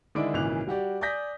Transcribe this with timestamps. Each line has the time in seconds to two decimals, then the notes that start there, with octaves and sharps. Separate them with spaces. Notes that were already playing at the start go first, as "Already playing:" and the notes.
0.15 D3 D#3 G#3 D4 E4 D7
0.34 G#1 A#2 C#3 E3 F#6 F7
0.67 G3 F#4 G4 D5
1.01 D5 G#5 D#6 G6 A#6 B6